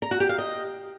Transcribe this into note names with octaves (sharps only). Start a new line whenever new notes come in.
A#5
F#4
G4
F5
D#5